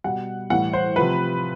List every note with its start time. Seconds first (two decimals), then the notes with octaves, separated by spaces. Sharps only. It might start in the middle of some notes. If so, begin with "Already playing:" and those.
0.04 B2 G3 F#5
0.50 A2 E3 G3 F#5
0.73 C5
0.96 C3 F3 B4